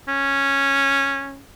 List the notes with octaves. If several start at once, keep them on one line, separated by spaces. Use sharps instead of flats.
C#4